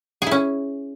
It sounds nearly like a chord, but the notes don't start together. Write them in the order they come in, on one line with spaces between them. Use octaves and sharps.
G#4 E4 C#4